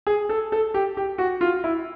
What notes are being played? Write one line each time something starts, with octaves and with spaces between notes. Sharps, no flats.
G#4
A4
A4
G4
G4
F#4
F4
E4